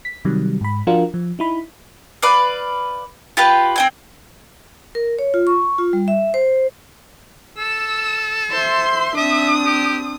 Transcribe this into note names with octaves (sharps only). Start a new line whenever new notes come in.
B6
C3 D#3 F#3 G3
G#2 B5
F3 D4 F4 F#4 A#4
F3
D#4 E4 B5
B4 D5 F5
F4 G4 B4
C4 G5 G#5
A#4
C#5
F4
C#6
F4
G3
E5
C5
A4 E6
C5 E5 C6
C4 D4 E5 D#6
G4